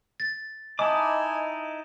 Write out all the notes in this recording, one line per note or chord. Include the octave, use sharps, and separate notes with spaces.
A6
D#4 E4 D#5 G#5 A5 D6 D#6